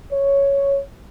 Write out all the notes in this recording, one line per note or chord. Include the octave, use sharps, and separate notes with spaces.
C#5